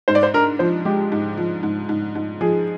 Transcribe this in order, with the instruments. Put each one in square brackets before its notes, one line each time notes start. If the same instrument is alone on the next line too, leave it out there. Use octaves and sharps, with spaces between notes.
[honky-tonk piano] G#2 [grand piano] C5
[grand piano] D5
C5
[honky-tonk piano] D4 [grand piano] A#4
[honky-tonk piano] F3 [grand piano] C5
[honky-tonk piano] G#3 [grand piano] G4
[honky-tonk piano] G#2
F3
G#2
G#2
G#2
[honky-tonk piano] F3 [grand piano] G#4